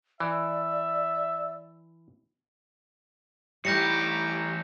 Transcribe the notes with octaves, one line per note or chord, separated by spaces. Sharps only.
E3 D5 E5
A2 E3 G3 D#4 G4 G6 A#6 C#7